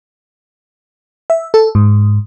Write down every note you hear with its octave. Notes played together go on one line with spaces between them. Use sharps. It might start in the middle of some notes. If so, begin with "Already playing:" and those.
E5
A4
G#2